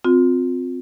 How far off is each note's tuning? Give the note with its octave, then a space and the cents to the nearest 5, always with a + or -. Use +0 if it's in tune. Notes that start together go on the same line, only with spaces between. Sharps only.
C4 -10 F4 +30